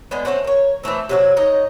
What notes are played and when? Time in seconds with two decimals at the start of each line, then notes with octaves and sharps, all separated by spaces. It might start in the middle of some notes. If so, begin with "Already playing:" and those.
0.11 D3 G#3 B3
0.25 A3 C4 C#4 F#5
0.44 A#4 C#5
0.83 E3 G#3 A3 C4
1.09 C3 F#3 F#4
1.37 D#4 C#5 D#5